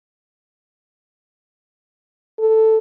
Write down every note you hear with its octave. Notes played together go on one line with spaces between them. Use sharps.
A4